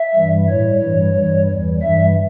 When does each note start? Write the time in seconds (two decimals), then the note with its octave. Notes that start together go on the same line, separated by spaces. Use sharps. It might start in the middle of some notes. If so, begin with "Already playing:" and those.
Already playing: E5
0.15 G2 E3 G3
0.48 A2 G3 C#5
0.81 G2 E3 G3
1.15 G2 E3 G3
1.48 E2 E3 G3
1.82 G2 E3 G3 E5